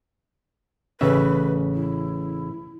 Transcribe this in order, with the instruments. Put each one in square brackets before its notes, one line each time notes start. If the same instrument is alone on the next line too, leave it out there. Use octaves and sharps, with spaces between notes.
[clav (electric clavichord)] A1 C#3 E5 [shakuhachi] B4
[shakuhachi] E4